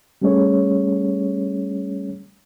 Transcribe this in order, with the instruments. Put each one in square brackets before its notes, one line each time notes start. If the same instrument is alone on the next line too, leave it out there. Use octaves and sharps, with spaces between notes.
[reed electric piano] G3 A3 C#4 G#4 C#5